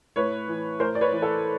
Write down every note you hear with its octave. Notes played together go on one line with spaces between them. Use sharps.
A2 B4 C#5
E3
A2 A#4 C5
D5
B4 C#5
E3
A4